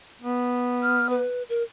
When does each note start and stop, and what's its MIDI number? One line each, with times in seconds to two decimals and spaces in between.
0.22 1.23 59
0.82 1.07 89
1.10 1.43 71
1.49 1.63 70